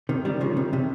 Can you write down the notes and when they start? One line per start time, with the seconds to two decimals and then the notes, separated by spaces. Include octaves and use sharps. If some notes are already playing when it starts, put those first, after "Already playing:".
0.09 C3 D#3
0.25 D#3 G3
0.41 C#3 F3
0.57 C3 D#3
0.73 C3